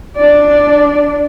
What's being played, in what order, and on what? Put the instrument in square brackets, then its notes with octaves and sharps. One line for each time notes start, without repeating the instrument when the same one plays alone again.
[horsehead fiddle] D4 D5